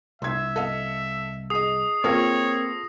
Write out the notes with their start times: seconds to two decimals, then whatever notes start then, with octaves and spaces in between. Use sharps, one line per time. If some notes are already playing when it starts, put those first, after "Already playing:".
0.22 C2 E5 C6 G#6
0.56 A4 D#5 F5
1.50 G#4 D#5 D#6 C7
2.04 A#3 C4 F4 G#4 A4 C#5 D#6 A#6